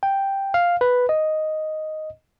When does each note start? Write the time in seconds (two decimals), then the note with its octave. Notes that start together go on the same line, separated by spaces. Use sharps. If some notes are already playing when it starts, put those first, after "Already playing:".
0.03 G5
0.54 F5
0.81 B4
1.09 D#5